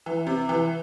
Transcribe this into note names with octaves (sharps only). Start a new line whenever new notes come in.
E3
C3
E3